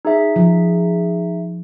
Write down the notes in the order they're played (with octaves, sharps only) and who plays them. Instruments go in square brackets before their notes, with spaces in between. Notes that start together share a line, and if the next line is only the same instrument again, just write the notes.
[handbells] D#4 G#4 E5
[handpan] F3